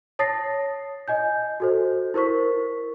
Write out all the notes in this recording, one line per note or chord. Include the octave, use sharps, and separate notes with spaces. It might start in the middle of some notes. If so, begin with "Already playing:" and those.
C#5 A5 D#6 A6 A#6 C7
D#5 G#5 G6
F#4 A4 C5
E4 A#4 C5 C#6 B6